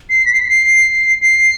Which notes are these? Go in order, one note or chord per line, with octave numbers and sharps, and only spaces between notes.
C7
B6
C7
B6
C7
C7